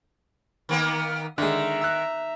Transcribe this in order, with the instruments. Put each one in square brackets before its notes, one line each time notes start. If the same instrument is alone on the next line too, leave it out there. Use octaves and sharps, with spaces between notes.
[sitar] D#3 A#3 B3
[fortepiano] D3 G#3 [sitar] D#3 [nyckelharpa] E5 A#5
[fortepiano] E6 F#6